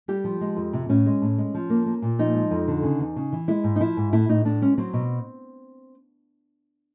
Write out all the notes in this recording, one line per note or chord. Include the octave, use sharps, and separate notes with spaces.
G3 G4
F3
G#3
F2
C3
A2 C#4
G#3
A2
G#3
F3
A#3
A#3
A#2
F3 D#4
G#3
F2
D3
C#3
E2
C#3
E3
G#3 E4
G#2
D#4
F3 E4
G#2
A2 E4
A2 D#4
A2 D4
G#3 C#4
F#3 C4
B2